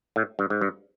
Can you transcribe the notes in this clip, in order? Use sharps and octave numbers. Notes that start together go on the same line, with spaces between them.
A2
G2
G#2
G2